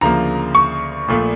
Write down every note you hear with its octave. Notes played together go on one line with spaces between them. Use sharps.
D2 C#3 F3 A#3 A#5
C#6
A#1 A#2 A3